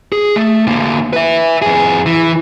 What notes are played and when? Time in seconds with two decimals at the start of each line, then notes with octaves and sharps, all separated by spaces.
0.12 G#4
0.36 A3
0.67 D3 A#3
1.13 B4 E5
1.62 F2 G#4
2.06 E3